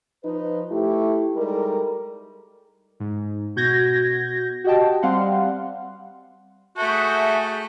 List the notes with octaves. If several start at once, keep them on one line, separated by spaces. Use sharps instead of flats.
F3 D#4 B4
A3 E4 G4
G3 G#3 D#4 A4 A#4
G#2
B2 F#4 G6 G#6 A#6
F#4 G4 D#5 G5 A5
G3 C4 F5 F#5 C6
A3 F#4 G#4 A4 E5 G6